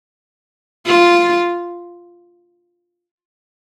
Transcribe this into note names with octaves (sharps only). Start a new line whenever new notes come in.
F4